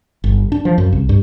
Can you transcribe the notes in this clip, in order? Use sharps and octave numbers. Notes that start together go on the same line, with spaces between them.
G1
D4
F3
F#2
C2
G2